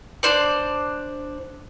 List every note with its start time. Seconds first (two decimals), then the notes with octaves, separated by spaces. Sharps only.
0.23 D4 C5 D5